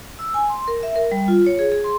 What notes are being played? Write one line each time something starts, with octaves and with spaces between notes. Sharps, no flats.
E6
G#5
C6
A#4
E5
A#4
G3
F4
C#5
G#4
G#4
C6